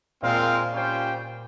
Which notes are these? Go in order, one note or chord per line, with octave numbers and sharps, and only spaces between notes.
A#2 G#3 C4 F4 A#4 F5
G3 C#4 F4 C5 G5